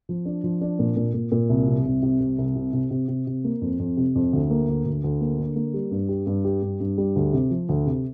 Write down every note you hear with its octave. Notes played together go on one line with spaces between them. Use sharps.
F3
D4
F3
D4
A#2
A#2
A#2
A#2
C2
C3
C2
C3
C2
C2
C3
C3
C3
C3
C3
A#3
F2
F2
C3
F2
D2
A#3
D2
D2
D2
A#3
D3
A#3
G3
G2
G4
G2
G4
G2
G2
G3
D2
C3
F3
D2
C3